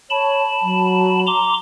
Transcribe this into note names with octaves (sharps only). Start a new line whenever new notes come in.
C#5 A5 B5
F#3
A#5 C6 D6